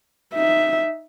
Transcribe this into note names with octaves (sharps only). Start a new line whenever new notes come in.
D#4 E5